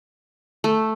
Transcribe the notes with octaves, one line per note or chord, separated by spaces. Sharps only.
A3